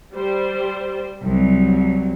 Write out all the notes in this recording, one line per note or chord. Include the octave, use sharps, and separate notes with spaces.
G3 C5
C2 F#3